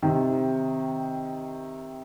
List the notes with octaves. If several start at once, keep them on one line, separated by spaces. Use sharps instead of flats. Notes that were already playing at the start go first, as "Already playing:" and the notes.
C3 D#3